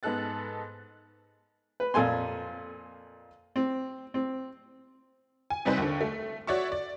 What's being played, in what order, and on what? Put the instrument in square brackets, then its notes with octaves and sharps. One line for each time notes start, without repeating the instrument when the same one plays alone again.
[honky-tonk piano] G#2 B3 D#4 A4 F#6 A6
[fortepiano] B4
F2 A#2 A4 G#5 C6
C4
C4
[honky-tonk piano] G#5
C3 G3 C4 D#4 B4 C5
D#2 D3
A3
F#4 C#5 D5 E5 C#6
D5